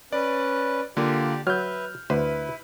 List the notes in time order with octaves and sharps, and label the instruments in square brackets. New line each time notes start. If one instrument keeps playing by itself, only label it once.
[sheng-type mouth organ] C#4 B4 [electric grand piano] D5
[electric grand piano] D3 A#3 F4 [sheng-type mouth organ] G4 D5
[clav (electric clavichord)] F#3 [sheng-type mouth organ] B4 E5 [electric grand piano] F6 G6
[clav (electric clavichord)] D2 C5 [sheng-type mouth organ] E4 [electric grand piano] B4